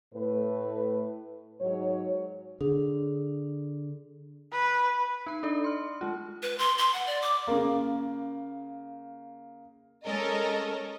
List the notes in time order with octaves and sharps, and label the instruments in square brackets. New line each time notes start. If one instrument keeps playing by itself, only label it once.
[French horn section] A2 A3 B4
G#2 F#3 C#5
[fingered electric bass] D3 [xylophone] G#4
[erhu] B4
[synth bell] D#4 B5
D4 A4 D5
C6 F6
G#3 F4
[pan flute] B4
C6
C6
F#5
D5
D6
[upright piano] C#3 A#3
[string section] G#3 C#4 A4 A#4 D#5